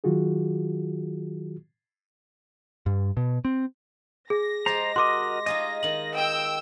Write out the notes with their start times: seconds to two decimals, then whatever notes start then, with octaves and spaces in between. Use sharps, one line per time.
0.04 D#3 F#3 F4 F#4 G#4
2.86 G2
3.17 B2
3.45 C4
4.30 G#4 A#6
4.66 G#3 G4 C5 A5 A#5
4.96 F#4 A#4 D#5 C6 D6
5.46 D#4 F4 G#4 D#5
5.83 D#3 D#4 F#7
6.15 G5 E6